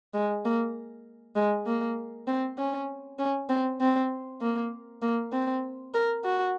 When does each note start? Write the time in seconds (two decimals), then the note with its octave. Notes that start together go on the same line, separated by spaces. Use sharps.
0.14 G#3
0.45 A#3
1.36 G#3
1.67 A#3
2.28 C4
2.58 C#4
3.19 C#4
3.50 C4
3.81 C4
4.41 A#3
5.02 A#3
5.33 C4
5.94 A#4
6.24 F#4